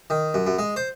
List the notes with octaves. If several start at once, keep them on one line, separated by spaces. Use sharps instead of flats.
D#3
F#2
F#2
G#3
C5